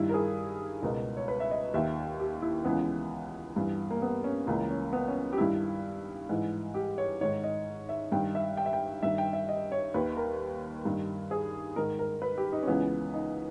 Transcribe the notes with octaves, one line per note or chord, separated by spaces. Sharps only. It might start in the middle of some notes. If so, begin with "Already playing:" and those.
Already playing: G2 D#3 E4
A#4
G#4
C#2 B2 A#4
C#5
B4
E5
D#5
D#2 D#3 E5
G4
E4
C#2 C#3 E3 B3
G2 E3
A#3
B3
C#4
C#2 C#3 E3 A#3
C#4
B3
C#4
G4
G2 D#3 E4
G#2 E3
G4
C#5
G#2 D#3 C#5
D#5
E5
G2 D#3 G5
E5
G5
E5
G5
G2 D#3 E5
G5
E5
D#5
C#5
D#2 D#3 B4
A#4
G2 D#3
G#4
G#2 D#3 A#4
A#4
B4
G4
D#4
C#4
C#2 C#3 E3 B3
D#4